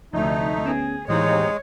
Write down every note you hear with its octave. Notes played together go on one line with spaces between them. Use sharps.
D2 C3 F3 A3 D#4
B3 C#4 G#4
D#2 A2 E3 G#3 C4 D#4 G4 C#5